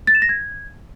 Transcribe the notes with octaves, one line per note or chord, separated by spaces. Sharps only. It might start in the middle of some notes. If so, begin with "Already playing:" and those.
A6
E7
A#6
G#6